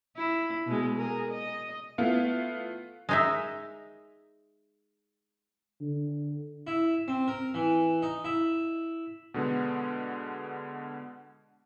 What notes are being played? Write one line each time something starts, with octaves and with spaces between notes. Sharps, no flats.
E4
B2 G#3
G#4 A#4
D#5
A3 B3 E4 F4 F5
G#3 D#4 E5
D3
E4
C4
A#4
E3
D#4
E4
B2 D3 G#3 B3